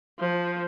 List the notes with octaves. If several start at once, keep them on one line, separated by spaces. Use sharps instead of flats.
F3